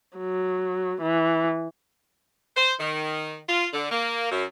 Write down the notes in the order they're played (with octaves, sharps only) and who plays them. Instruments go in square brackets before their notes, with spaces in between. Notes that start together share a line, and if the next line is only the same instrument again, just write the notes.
[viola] F#3
E3
[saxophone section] C5
D#3
F4
D3
A#3
F#2